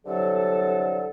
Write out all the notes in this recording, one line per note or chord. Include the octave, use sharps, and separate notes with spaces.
C2 D3 F#3 A4